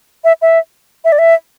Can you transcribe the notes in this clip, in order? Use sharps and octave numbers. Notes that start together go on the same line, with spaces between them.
E5
E5
E5
D5
E5